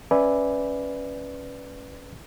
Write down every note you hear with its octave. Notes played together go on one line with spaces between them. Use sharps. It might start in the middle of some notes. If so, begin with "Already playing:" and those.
C#4 B4 D5 E5 G#5